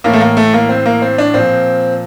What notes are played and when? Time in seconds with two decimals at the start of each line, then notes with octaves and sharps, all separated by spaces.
0.04 A2 E3 A#3
0.13 A3
0.21 A#3
0.37 A3
0.54 A#3
0.69 C4
0.86 A#3
1.02 C4
1.18 D4
1.34 A#2 F3 C4